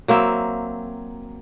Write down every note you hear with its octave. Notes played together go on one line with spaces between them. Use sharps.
F#3 A#3 C4 E5